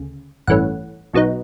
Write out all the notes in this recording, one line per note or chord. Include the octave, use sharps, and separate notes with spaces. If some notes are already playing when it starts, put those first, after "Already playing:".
Already playing: D2 C#3
A1 G2 E3 A3 C#4 F#5
B1 B2 F#3 B3 D#4